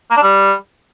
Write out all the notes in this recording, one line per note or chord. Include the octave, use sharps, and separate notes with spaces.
A#3
D4
G3